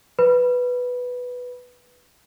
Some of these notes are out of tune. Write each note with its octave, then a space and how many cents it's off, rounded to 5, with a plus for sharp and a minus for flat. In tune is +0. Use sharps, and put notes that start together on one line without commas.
B4 +0 B5 -15